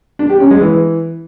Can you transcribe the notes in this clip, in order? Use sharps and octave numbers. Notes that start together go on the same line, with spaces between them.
D4
G4
C#4
G#3
E3